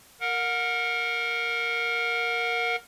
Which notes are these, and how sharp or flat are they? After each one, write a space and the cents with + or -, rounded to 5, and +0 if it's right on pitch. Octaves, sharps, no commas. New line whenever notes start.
A#4 +0 F#5 -35